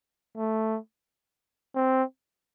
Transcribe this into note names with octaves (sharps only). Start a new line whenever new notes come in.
A3
C4